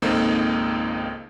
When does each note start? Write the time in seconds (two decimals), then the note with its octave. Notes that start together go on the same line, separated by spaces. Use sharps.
0.02 G#1 C#2 A#3 C4 D#4 A4